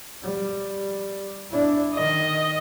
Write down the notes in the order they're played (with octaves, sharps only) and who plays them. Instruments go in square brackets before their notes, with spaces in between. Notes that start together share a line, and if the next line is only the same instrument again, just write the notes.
[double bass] G3
D4 E4
[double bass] D#3 [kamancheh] D#5